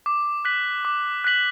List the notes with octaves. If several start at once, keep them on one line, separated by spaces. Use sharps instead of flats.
D6
F#6 B6 F#7
D6
F#6 B6 F#7